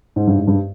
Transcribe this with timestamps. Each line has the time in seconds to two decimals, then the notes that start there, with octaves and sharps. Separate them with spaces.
0.16 G#2
0.27 G2
0.38 G#2
0.47 G2